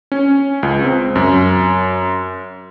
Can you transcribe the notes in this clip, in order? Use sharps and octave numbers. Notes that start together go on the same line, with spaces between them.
C#4
C#2
C4
F#2